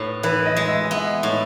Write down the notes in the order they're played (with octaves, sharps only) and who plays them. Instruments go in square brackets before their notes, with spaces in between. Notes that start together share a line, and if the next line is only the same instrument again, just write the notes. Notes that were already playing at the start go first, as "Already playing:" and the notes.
Already playing: [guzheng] A2 B3
[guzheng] E3 [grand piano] B4
[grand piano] D#5
[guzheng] G#3
[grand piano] E5
D#5
[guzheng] B3 [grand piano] E5
[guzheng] A2